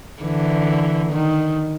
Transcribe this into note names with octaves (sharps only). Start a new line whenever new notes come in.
D3 E3
D#3